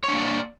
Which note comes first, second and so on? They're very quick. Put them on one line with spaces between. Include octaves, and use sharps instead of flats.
C#5 D4 A#3 D5